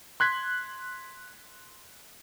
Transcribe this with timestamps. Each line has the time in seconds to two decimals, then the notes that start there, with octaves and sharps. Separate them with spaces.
0.20 C6 F#6 G#6 B6